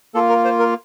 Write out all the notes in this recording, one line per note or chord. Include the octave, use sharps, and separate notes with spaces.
A#3 F4 A4
A#4
C5
A#4